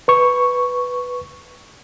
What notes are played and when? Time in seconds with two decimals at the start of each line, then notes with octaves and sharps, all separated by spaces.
0.08 B4 C#6